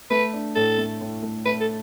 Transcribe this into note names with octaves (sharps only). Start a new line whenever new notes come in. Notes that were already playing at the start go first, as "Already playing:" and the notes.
A3 B4
D4
A2 A4
A3
A2
A3
A3 B4
A4